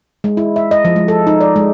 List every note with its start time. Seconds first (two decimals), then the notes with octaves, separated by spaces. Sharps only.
0.24 G#3
0.37 E4
0.56 E5
0.71 D#5
0.85 F3
0.96 G#3
1.08 A4
1.27 D#4
1.41 D5
1.56 G#3